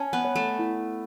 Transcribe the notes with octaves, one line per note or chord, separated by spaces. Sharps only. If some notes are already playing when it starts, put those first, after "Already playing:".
Already playing: C#4 A5
B3
C#5
A3
E4